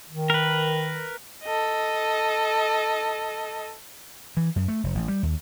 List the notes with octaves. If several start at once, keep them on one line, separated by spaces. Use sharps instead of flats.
D#3
A#4 B4
A4 D#5
E3
F#2
A3
F1
A1
G3
D#2